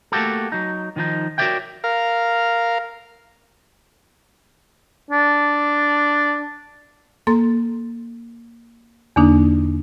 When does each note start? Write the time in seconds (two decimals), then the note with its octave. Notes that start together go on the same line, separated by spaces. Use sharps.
0.12 A3 A#3 F#4 G4 A4
0.52 F#3 D#4
0.96 D#3 F3 D#4
1.38 F#4 A#4 C#5 D5 E5 G5
1.84 A#4 F5
5.11 D4
7.27 A#3 A4 C6 A6
9.16 E2 D3 A#3 D4 D#4